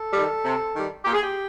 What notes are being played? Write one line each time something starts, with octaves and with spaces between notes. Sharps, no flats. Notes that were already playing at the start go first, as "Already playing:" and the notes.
Already playing: A4
D#3 G3
C3
D#3 G3
A#2 G4
G#4
G4